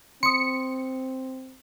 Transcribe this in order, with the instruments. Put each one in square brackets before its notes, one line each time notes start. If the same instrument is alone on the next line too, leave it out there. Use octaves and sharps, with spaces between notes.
[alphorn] C4 [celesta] C6 D#6 [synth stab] C#7